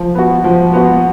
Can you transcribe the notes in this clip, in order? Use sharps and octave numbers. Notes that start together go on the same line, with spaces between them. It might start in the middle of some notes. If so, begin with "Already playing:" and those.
Already playing: F3
B3 F#4
F3
B3 F#4